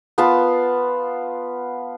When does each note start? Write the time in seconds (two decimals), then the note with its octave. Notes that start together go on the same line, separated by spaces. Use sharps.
0.18 B3 F4 A5 B5